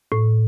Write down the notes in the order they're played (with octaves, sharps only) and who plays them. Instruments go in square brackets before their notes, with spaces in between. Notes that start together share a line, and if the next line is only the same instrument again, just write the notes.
[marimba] A2